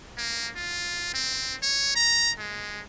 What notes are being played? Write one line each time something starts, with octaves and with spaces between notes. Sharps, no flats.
A#3
F4
C4
C#5
A#5
G#3